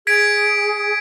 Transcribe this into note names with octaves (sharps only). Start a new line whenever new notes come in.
G#4 G#6 B6 D7